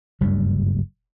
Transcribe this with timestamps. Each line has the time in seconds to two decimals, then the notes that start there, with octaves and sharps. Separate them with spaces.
0.21 F#1 D2 G2 G3